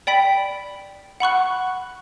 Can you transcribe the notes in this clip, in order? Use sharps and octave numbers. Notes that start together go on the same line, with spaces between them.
D5 G5 B5 B6
F#5 B5 C#6 F#6